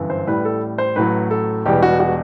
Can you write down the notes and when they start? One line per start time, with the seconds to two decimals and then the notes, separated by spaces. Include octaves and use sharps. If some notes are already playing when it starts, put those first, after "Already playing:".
Already playing: G1 F#2 E3
0.10 C5
0.27 A1 A2 G3 B4
0.45 A4
0.78 C5
0.96 A1 A2 F#3 B4
1.31 A4
1.65 E1 E2 B2 G3 G4
1.83 F#4
2.00 F#4